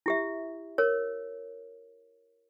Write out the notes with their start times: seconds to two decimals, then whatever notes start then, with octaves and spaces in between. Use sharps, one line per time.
0.06 E4 G4 E5
0.78 A#4 C#5